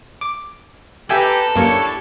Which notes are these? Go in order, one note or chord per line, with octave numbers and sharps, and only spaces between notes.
D6
G4 A4 B4 E5 G5 G#5 A#5
F#2 A#3 D4 E4 G4 C#5